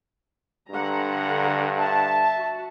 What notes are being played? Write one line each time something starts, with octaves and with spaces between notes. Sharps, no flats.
G2 D3 F#5 A#5
E5 A5
F#4